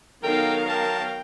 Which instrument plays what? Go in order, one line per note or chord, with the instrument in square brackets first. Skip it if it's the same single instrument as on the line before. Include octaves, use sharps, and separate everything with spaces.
[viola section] D#3 B3 F5 [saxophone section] F#3 A#4 [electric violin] D#4 A4 [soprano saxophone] G5
[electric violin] G5 [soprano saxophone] A5